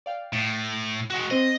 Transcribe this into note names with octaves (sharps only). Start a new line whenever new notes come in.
D5 F5 G5
A2 A6 C7
G#3 F#4 F#5 C#6 F#6
C4 C5 D#5